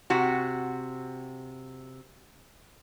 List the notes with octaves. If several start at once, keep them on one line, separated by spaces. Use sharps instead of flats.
C3 F#4